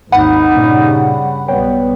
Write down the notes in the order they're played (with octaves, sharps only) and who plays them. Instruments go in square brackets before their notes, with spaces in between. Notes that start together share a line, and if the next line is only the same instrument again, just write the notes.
[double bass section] G#1 D#2 [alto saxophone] D#4 [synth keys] F#5 B5
[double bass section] G2 C#3 G3 [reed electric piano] A#2
[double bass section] B1 G3 B3 [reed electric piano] C#5 G5